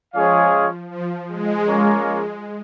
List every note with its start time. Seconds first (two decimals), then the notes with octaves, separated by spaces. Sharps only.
0.13 F3 G#3 C#4 G#4 C#5 F5
0.91 F3
1.28 G#3
1.67 A#3 C#4 F4 A#4 C#5